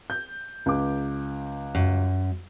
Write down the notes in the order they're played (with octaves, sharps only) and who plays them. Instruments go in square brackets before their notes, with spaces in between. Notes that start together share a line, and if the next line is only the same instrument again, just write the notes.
[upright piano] G6
C#2 D6
[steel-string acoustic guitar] F#2